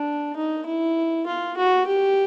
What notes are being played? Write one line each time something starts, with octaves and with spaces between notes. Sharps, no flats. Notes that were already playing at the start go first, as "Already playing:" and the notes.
Already playing: D4
D#4
E4
F4
F#4
G4